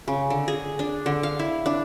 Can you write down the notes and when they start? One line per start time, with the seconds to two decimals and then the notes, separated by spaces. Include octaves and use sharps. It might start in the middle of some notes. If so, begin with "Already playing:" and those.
0.08 C#3
0.30 D3
0.48 G#4
0.79 D4
1.06 D3
1.23 F5
1.39 E4
1.66 D4